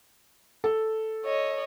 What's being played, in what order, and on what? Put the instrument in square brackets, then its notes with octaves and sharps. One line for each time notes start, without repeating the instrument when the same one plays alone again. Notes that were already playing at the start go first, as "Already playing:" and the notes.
[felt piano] A4
[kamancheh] C#5 D#5